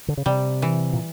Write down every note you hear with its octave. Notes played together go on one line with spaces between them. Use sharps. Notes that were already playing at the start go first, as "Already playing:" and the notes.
D3
C#3
C3 G3
E3
A#2